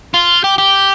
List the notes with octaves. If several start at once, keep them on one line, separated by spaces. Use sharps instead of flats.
F4
G4
G4